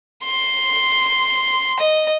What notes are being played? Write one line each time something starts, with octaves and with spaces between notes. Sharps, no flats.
C6
D#5